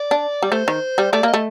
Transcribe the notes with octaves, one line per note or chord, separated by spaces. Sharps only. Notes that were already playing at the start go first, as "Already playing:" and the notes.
Already playing: D5
D4
G3
A3 C5
D#3
G3
A3 D5
A#3 D#5
A3